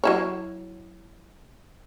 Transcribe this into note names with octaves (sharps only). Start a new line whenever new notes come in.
F#3 E4 C#5